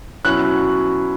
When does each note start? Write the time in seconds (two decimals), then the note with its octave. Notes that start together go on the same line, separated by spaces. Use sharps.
0.25 B2 F#3 C#4 E4 F#6